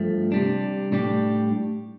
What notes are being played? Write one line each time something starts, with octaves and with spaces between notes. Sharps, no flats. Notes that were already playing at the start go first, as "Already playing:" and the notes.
Already playing: G2 F3 A3
C3 G3 D4
A2 G3 D4 G4